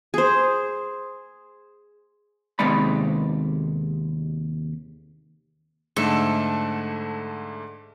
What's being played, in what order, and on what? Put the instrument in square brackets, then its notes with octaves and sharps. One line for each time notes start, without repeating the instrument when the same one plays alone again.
[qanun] G#4 C5
[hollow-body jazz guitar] D#2 C3 G#3 B3 D5 B5
[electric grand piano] G#2 D3 A3 [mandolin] A4